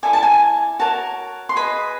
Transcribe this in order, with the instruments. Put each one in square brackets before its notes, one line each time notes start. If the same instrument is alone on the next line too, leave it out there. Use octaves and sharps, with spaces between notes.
[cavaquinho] E4 A4 D5 G#5
A5
G#5
F#4 A#4 C#5 A5
C6
G#4 B4 D#5 B5